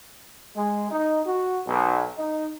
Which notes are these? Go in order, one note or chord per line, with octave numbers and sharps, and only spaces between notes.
G#3
D#4
F#4
B1
D#4